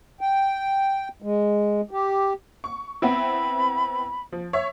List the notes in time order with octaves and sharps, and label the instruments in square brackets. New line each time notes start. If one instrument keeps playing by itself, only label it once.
[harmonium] G5
G#3
G4
[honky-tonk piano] C#6
[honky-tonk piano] B3 C4 E4 [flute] B5
[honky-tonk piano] F3
C#5 E5